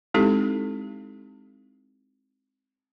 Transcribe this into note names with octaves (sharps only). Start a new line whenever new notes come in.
G#3 C4 D#4 E4 G4 A4